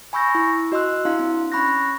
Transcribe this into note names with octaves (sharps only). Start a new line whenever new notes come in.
G#5 B5 C#6 E6 G6 A#6
E4
F#4 D#5 C6 E6 F#6
D4 E4 F5 C6
C4
C#4 B5 C#6 F#6 A#6